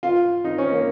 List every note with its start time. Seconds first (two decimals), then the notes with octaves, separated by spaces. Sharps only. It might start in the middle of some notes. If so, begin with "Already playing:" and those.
0.03 F4
0.44 D#4
0.58 C#4
0.72 A#3